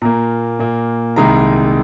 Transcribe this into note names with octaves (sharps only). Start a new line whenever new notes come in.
A#2 A#3 A#5
A#2 A#3
C2 C3 D#3 G#3 A#5